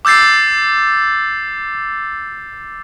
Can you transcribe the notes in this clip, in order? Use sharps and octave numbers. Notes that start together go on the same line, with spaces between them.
D6 E6 G6 A6 C7